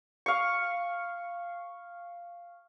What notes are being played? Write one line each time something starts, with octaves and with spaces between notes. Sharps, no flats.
F5 C#6